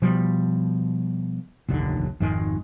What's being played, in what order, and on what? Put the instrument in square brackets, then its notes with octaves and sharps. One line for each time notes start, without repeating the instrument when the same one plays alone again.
[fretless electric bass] B2 F3 G3
F1 A#1 D#2 D3
G#1 F2 D#3 G#3